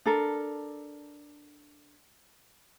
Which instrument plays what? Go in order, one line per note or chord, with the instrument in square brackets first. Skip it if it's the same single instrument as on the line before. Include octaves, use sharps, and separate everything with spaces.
[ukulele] D4 A4 A#4